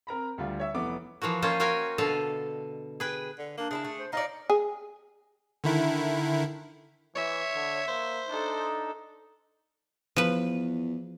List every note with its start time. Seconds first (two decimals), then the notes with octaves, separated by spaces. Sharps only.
0.07 C4 A#4 A#5 B5
0.38 D2 D3 G3 F4
0.60 C#5 E5 E6
0.74 F1 E3 B3 D6
1.22 E3 F3 A#3 F#4
1.42 A#3 C#4 F4 C5 D#5
1.60 F#4 A#4 D#5 F5 G5 G#5
1.98 B2 D3 A4 D#5 F5
3.00 G#4 B4 G5
3.39 D3
3.58 A#3 D4
3.71 C#3 E4 G#4 A5
3.85 A3
3.99 C5
4.13 D#4 F4 C#5 D5 A#5
4.50 G#4
5.64 D3 D#3 E4
7.16 E3 C#5 E5
7.55 D3
7.88 A#3 C5
8.29 D4 D#4 A4
10.16 E2 F3 B4